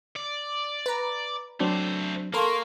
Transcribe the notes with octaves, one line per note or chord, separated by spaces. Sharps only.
D5
B4 A#5
F#3 A3 C4 D4 C5
A#3 A4 A#4 F5 C6 C#6